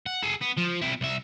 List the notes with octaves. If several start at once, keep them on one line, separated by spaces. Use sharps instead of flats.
F#5
G#4 A4
B3
F3
C4 E4
C2 E5